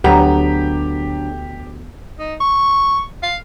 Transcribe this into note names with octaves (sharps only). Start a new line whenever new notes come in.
D2 D3 F#3 B3 G4 A#5
D#4
C#6
F5